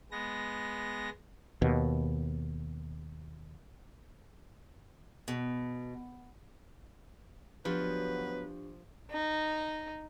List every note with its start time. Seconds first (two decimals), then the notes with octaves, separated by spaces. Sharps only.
0.11 G#3 B3 A#6
1.62 D#2 B2
5.28 B2
7.65 D2 F3 F#3 B3 D4 G4 B4
9.11 D#4 D#5